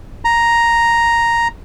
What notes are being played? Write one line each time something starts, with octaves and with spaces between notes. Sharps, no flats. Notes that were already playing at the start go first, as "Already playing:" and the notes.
A#5